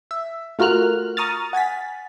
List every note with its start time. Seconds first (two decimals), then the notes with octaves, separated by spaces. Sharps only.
0.11 E5
0.59 A3 F4 F#4 A#4 F6 F#6
1.17 A#5 C#6 D#6 F6 A6
1.53 F#5 G#5 A6 B6